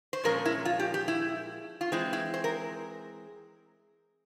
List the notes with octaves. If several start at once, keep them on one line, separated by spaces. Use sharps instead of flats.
C5
A#2 F3 G#3 C#4 A#4
E4
F4
G4
G4
E4
F4
E3 G#3 C4 E4
E4
C5
A#4